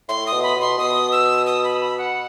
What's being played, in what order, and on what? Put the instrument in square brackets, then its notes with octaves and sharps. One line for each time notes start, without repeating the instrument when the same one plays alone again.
[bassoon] A2 [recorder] C6
[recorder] D#6
[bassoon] B2
[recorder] B5
[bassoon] B2
[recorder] C6
[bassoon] B2 [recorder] D#6
[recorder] E6
D#6
B5
B5
F#5